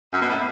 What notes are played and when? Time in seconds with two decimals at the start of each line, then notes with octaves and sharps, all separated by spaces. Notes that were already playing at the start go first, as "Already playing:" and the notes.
0.13 F#2
0.21 B2
0.29 A2